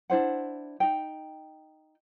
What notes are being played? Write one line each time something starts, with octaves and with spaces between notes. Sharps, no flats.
D4 E4 C5 F#5
D#4 G5